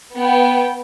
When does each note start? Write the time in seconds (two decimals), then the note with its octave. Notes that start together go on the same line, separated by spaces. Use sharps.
0.16 B3 G5